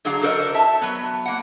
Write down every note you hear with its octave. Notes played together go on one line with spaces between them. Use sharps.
D3 F#3 D4 G#4 F5 A#5
F#4 A4 A#4 C5 D5 D#5
E5 A5
F#3 B3
A#3 F#5